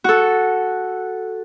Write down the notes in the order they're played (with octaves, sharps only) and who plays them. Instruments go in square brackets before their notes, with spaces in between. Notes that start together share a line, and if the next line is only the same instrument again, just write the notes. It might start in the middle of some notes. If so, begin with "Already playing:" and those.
[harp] F#4 A4